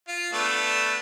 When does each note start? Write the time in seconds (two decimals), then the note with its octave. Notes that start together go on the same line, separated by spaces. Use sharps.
0.08 F4
0.33 A3 B3 D4